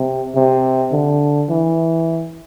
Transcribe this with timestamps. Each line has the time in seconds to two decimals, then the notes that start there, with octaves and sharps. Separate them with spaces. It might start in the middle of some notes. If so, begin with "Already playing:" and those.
Already playing: C3
0.35 C3
0.92 D3
1.50 E3